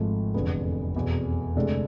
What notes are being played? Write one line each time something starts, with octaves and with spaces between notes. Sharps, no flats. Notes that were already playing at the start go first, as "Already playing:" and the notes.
Already playing: G#1 G#2 F3 A3
F1 E2 D3 F3 B3
F1 E2 B2
D2 C3 G#3 D4 A4